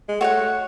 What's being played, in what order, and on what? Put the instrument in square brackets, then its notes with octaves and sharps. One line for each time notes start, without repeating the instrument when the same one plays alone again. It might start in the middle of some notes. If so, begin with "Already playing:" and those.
[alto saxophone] G#3
[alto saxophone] A3 [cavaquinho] F#4 C#5 F#5